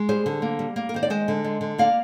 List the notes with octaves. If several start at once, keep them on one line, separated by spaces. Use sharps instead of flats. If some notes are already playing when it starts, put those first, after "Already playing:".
Already playing: G#3
G3 G#4 C5
D3
A#3
G3
A#3
A#4
D#3 C5
D5
G#3 C5 D#5
D3
G#3
D3
A#3 D5 F5